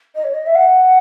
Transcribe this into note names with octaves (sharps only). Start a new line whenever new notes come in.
D#5
C#5
D#5
E5
F#5